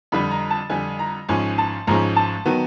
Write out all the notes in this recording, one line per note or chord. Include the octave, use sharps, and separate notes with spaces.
F2 D3 G3 B5
A#5
A5
F2 D3 G3 G#5
A#5
G#1 G#2 F3 G#3 C#4 G#5
A5
G#1 G#2 F3 G#3 C#4 A#5
A5
D#3 F#3 B3